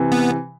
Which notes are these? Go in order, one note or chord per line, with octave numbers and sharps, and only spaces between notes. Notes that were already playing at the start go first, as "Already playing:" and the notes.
Already playing: C3 E3
B3